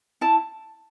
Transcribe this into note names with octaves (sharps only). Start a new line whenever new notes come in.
E4 A5